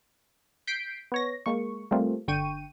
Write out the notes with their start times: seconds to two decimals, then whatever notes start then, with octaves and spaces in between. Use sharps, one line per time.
0.67 G6 B6 C7 D7
1.12 B3 C#5 A#6
1.46 G#3 A#3 C#6
1.91 G3 A3 A#3 C4 F4
2.28 G1 D3 G5 C#6 D#7